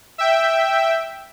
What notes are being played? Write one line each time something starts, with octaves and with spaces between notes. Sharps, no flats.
E5 G5